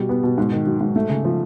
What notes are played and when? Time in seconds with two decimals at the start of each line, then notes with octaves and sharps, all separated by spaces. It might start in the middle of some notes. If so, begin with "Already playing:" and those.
Already playing: B2 G3
0.09 B3
0.23 B2
0.38 G#2
0.52 D#3
0.67 F#3
0.81 G#2
0.96 A3
1.09 C#3
1.25 F3